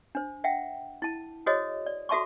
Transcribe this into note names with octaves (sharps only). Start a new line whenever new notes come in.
D4 C5
E5 F#5 G5
E4 A5
F#4 G#4 C5 C#5 D#5 D#6
D5
F#4 A4 E5 A5 C6 C#6